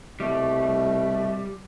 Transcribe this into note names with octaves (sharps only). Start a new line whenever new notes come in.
C2 B2 G3 A3